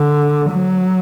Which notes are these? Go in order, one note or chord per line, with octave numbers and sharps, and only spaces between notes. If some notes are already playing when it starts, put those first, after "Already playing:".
Already playing: D3
F#3